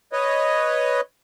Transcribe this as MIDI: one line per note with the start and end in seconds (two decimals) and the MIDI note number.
0.13 1.01 71
0.13 1.01 73
0.13 1.01 75